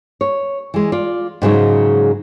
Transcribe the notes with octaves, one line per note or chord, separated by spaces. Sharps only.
C#5
E3 G#3
F4 D5
G#2 C#3 F#3 G#3